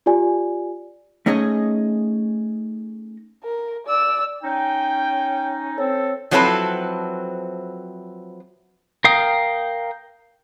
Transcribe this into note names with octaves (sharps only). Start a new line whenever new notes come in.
F4 G4 D5 G#5
A3 C#4 D#4 G#4 D#5
A#4
D5 E6
C#4 D#4 G5
C4 A4 C#5
F3 F#3 C4 E4 A4 B4
A#4 F5 G5 D#6